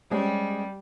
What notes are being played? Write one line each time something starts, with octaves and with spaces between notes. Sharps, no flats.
G3 G#3 C4 C#4